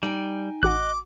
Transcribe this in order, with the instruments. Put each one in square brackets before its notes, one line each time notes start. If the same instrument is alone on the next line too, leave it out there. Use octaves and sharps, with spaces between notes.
[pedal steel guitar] G3 [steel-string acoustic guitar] D#4 G5 G#5
[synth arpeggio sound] A1 F#4 F#5 [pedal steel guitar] D#5 F#6 [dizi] D6